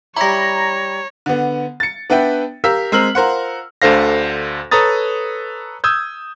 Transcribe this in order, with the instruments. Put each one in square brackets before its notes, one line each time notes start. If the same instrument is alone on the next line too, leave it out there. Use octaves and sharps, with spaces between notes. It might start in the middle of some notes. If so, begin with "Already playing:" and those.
[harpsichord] G3 E4 [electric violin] C#5 [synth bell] A#5 A#6
[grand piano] D3 B3
A6 C#7
B3 D4 B4 E5 G5
G4 A#4 F5 E6 B6
G#3 C4 A#4 E6 F6 F#7
F4 A#4 C5 F#5
[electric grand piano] D2 D3 A4 C5 F5 A#6
A4 B4 C#5 A#5 D#6 A6
D#6 E6 G6 G#6